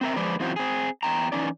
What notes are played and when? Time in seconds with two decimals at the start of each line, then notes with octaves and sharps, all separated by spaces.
0.01 C4 A#4 E5
0.16 F3 G#3 B4 D5
0.40 F#2 E3 C4 F4 F#4 C5
0.56 C4 G#4
1.03 E2 G5 A#5
1.32 E3 C#4 D#4 D5